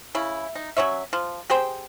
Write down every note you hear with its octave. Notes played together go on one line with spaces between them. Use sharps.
C#3 E4
D#4
F#3 C#4 C#5 E5
F3
G4 G#4 C5 G5